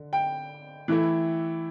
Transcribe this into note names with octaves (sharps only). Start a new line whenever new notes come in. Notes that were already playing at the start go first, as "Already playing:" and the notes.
Already playing: D3
G5
E3 A3 E4